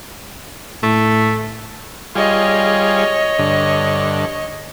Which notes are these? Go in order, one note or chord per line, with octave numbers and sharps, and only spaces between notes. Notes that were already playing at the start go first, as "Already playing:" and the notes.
A2 A3
G3 F4 G#4 C#5 D#5
G2 D3